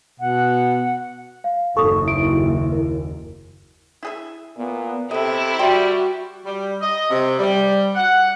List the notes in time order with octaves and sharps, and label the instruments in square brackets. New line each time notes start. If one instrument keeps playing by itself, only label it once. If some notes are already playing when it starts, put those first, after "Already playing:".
[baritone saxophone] B2 [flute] F#5
[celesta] F5
[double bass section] F#1 D#2 [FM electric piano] A4 [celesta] C#6 D#6
[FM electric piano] E4 [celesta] D7
[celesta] A#4
[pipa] E4 G#4 E5
[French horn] A#2 [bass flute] B3
[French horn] C3 [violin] E4 [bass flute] A4 [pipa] B4 D#5
[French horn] G3 [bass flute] F#4 [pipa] G5 B5 C6
[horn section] G3
D#5
C3
G3
F#5